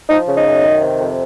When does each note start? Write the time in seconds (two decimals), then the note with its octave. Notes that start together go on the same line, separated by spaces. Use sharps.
0.09 F3 D#4
0.26 C#3
0.37 D#4
0.45 F#2
0.64 D#3
0.81 C3
1.00 F2